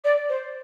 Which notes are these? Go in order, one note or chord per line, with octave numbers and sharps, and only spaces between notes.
D5
C5